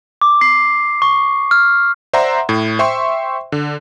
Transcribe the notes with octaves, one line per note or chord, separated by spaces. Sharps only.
D6
C7
C#6
F6
C5 D5 E5 F#5 A#5 C6
A2
C5 E5 G5 C6 C#6
D3